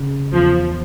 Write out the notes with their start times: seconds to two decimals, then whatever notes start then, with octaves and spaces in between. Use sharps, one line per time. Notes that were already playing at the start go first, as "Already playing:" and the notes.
Already playing: C#3
0.33 E2 F3